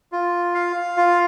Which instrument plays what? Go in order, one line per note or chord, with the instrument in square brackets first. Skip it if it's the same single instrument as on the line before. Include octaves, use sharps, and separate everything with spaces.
[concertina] F4
F5
F4